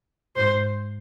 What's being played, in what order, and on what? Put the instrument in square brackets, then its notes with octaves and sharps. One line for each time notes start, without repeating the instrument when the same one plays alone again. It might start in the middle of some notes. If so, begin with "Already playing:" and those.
[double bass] G#2 [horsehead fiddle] C5